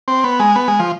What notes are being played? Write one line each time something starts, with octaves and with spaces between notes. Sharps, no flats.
C4
B3
G#3
B3
G#3
F3